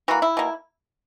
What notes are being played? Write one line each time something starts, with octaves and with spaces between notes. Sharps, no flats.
E3 A#3 F#4
E4
B2 A#3